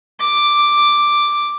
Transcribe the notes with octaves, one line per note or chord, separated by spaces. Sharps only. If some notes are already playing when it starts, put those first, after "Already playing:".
D6